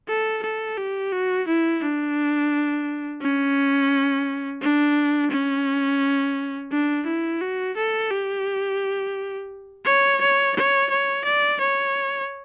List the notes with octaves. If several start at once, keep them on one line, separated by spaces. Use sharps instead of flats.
A4
A4
G4
F#4
E4
D4
C#4
D4
C#4
D4
E4
F#4
A4
G4
C#5
C#5
C#5
C#5
D5
C#5